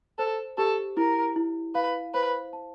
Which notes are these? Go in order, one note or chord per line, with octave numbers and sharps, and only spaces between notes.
A4 C5
G4 A4
E4 A#4
E4
B4 F5
B4 C5
A5